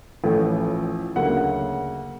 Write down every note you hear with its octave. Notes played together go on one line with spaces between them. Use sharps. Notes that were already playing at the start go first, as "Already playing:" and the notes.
A1 A2 F3 A3
D2 C#3 F#3 A#3 F#5